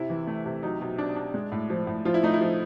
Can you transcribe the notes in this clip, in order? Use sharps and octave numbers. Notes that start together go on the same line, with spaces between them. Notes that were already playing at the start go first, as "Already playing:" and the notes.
Already playing: C3 E4
E3
A3
C3
F#3 D#4
B2
D4
D4
G#3
A2
F3
A2
F3 F4
E4
A3 D#4
E4
F3